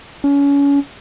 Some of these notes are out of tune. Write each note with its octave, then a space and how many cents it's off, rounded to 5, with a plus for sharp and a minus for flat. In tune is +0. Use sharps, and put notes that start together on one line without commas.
C#4 +30